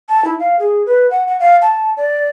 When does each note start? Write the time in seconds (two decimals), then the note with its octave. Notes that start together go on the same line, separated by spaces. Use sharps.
0.09 A5
0.25 E4
0.39 F5
0.59 G#4
0.86 B4
1.10 F#5
1.27 F#5
1.40 F5
1.62 A5
1.97 D5